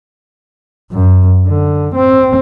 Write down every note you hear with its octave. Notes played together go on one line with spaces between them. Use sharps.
F#2
D3
C4